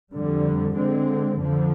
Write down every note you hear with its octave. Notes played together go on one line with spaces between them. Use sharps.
F2 D3 G3
D3 G#3 C4
F2 D3 F3